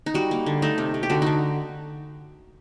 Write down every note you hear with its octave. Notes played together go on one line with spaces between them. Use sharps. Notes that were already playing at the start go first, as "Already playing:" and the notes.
D#4
G3 F#4
A#3
D3
A3 D#4
C3
C3
G4
D3 F#4
D3 D#4